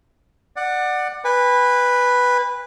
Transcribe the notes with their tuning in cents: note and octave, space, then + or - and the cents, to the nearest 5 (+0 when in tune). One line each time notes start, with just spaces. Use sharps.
D5 +25 F#5 +0
B4 +0 G#5 -40